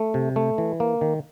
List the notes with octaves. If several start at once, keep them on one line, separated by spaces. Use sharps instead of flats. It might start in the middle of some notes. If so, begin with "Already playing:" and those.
Already playing: A3
C3
A3
E3
A#3
D#3